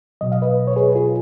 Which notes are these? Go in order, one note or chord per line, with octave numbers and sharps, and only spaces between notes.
B2 F#3 D#5
F5
B4 D#5
C#5
G#4 B4
F4 G#4